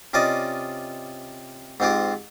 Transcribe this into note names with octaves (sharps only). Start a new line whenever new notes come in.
C3 C#4 F4 D5 D#5
G#2 C4 F4 G4